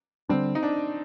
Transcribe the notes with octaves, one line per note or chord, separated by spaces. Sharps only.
D3 G3 C4 D4
D#4
D4